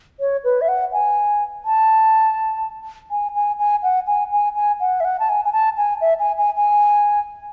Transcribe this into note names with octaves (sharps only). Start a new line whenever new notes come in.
C#5
B4
E5
F#5
G#5
A5
G#5
G#5
G#5
F#5
G#5
G#5
G#5
F#5
E5
F#5
A5
G#5
G#5
A5
G#5
E5
G#5
G#5
G#5